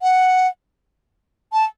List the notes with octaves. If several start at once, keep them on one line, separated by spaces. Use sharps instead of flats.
F#5
A5